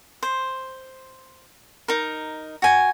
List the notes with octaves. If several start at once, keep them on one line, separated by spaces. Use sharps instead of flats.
C5
D#4 A#4
F#4 G#5